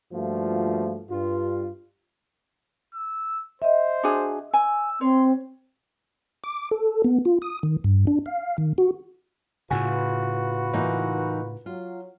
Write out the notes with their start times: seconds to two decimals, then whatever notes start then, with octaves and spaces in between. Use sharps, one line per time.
0.13 G2 F3 A3 A#3 F4 F#4
1.09 G2 F4
2.94 E6
3.62 C5 D#5 E5
4.03 D4 F#4 G#4
4.54 G#5 E6
5.01 C4 C#5 C6
6.44 D6
6.71 A4
7.04 B3
7.25 F4
7.42 D#6
7.63 D#3
7.84 G2
8.07 D4
8.26 F5
8.58 D#3
8.78 F#4
9.71 A2 C#3 F4 F#4 B4 G#5
10.73 E3 A#3 D#4
11.66 F#3 F4